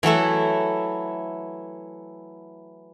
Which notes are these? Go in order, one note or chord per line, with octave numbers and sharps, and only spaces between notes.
E3 F#3 A3 E4